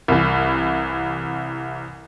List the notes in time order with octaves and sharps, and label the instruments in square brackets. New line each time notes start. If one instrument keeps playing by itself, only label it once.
[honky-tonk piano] C2 E3